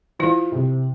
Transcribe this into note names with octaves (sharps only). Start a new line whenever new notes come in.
E3 E4 F4
C3